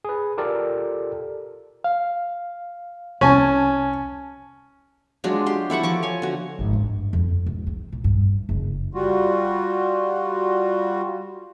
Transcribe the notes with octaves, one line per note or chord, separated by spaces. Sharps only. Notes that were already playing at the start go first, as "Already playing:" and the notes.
G#4 B4
F4 G4 A4 A#4 D5
F5
C2 C#4 G#5 A5
F#3 G#3 D4 F4
G4 C6
E4 A4 F#5 C#6
F3 C#6 D6
C#5 G#5
D3 F#4
G#1
G2
F2
E1
C4
A#2
G2
F#1
G3 F4 F#4